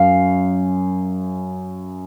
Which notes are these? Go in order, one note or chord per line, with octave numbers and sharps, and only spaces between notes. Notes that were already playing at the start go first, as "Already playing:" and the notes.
Already playing: F#2 F5